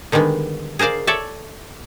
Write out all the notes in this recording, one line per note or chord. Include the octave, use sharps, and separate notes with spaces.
D3 D#3 G3 G#3 B3
G#4 A#4 C5 D5 F5
A4 C#5 D5 E5